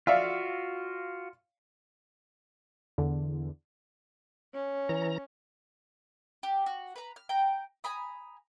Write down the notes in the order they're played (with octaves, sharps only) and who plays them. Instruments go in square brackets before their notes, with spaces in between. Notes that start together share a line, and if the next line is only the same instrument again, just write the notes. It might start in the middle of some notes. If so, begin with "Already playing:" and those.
[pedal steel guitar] F4 F#4 [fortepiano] D5 E5 F5
[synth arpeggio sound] E2 D3
[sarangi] C#4
[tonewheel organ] E3 A#5
[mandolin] G4
F#4
B4 A#5
F6
G5 A#5
G#5 A#5 B5 D#6